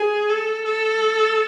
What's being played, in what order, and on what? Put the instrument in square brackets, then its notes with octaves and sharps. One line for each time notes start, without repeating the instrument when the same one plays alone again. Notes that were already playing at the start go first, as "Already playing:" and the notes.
Already playing: [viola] G#4
A4
A4